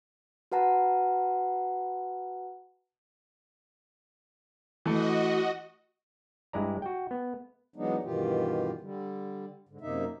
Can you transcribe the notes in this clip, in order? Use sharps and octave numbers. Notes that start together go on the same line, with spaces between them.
F#4 B4 F#5 A5 A#5
E3 A3 F#4 D#5
G2 G#3 E4 D5 A#5
F#4 G5
B3
E3 F#3 G#3 B3 D4 D#4
G2 B2 D#3 E3 F4 G4
D3 G3
G#2 D3
F#2 C3 A#3 D#4 E5